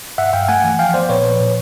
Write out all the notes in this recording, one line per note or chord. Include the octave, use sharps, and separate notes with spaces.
G2 E5 F#5
G2 F5 G5
A3 F#5 G#5
E3
F3 F5 G5
B3 C5 D5
A#2 B4 C#5
F3
A#2